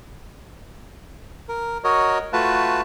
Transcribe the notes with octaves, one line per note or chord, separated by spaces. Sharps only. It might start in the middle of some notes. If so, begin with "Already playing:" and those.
A#4
F#4 A#4 C#5 D#5
A3 F4 F#4 B4 A5